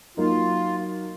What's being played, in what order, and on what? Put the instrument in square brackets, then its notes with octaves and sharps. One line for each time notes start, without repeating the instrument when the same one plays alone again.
[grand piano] F#3 A#3 D#4 [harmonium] F4